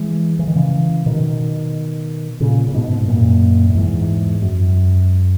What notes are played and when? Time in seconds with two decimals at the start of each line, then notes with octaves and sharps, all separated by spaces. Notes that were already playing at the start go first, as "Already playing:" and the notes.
Already playing: E3 G#3
0.39 E3
0.47 D#3
0.55 C#3 E3
1.06 B2 D#3
2.40 A#2 C#3
2.68 A#2
2.74 G#2 B2
3.01 G#2
3.08 F#2 A#2
3.69 A#2
3.75 E2 G#2
4.42 F#2